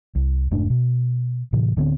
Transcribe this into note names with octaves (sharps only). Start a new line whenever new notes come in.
C2
F1 G#2 A3 D4
B2
A2 C3 E3
D1 D3 B3 C4